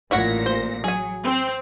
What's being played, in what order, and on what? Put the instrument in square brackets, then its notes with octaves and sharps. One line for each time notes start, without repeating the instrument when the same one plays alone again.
[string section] A1 A#2 A#6 [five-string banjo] E4 C#5 F#5
[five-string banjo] C5
[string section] F#3 [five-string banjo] G#4 G#5
[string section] C4